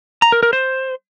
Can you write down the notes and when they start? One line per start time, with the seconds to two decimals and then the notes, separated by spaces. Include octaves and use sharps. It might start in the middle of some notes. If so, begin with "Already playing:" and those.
0.22 A#5
0.32 A#4
0.43 A#4
0.53 C5